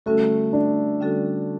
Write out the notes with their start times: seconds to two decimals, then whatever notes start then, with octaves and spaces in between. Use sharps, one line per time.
0.06 D3 G3 A3 C#4 F#4 A4
0.53 D4
1.00 D3 G3 C#4 F#4 A4